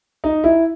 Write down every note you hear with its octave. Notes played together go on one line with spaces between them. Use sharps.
D#4
E4